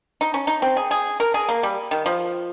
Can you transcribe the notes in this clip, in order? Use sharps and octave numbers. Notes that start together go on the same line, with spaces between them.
D#4
C#4
D#4
C4
G#4
G#4
A#4
G#4
A#3
G3
D#3
F3